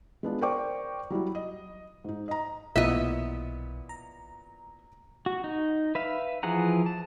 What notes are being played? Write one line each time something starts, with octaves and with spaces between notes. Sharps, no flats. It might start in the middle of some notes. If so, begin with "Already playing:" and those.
G#3 B3 D4 F4
A#4 C5 D5 G5 C#6 D6
F#3 G3 E4 F#4
D#5
G#2 D#4
D#5 A#5
B1 A#2 E3 B3 D#5 E5
A#5
F#4
D#4
B4 E5 F5
E3 F3 G#4 F#5 A#5
A5